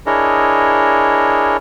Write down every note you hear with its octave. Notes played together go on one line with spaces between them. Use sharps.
D4 E4 G#4 A#4 C#5 D#5